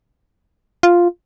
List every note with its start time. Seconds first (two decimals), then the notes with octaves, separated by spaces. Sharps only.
0.83 F4